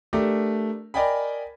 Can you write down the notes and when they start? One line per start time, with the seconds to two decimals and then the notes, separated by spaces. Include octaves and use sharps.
0.13 A3 D4 G4 A#4
0.94 A#4 D5 D#5 G5 G#5 B5